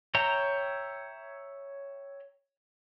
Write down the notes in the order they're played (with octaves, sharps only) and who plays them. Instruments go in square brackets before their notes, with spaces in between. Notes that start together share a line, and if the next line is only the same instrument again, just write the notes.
[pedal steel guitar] C#5 E5 G5 A#5